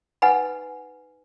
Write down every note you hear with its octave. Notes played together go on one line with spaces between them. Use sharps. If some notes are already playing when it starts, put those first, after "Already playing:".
D#4 B4 F#5 G#5 B5